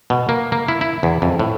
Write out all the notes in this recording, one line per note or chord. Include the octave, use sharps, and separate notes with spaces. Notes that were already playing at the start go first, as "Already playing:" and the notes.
B2
A#3
A#3
E4
E4
E2
F2
A2